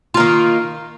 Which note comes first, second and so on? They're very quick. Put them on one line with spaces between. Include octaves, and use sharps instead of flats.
F4 A#3 D#3